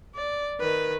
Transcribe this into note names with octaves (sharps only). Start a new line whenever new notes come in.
D5
D#3 B4